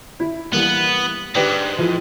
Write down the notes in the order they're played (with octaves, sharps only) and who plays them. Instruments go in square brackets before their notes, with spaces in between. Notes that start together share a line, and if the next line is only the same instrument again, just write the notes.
[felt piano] E4
[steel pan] E3 G3 A#3 [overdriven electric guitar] B3
[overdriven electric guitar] G#2 [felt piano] D4 G4 B4
[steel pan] E3 F3 [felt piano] B4